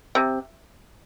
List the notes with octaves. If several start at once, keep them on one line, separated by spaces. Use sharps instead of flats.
C3